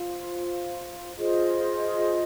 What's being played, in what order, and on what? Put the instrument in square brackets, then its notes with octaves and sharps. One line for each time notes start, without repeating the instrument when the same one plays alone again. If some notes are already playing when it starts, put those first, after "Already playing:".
Already playing: [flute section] F4 C5 F5
F4 G#4 C5 D#5